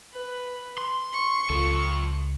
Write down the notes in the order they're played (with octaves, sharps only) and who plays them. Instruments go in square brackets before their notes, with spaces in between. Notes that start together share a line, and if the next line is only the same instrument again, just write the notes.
[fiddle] B4
[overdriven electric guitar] C6
[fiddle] C#6
[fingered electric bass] C#2 [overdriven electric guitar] F4 A4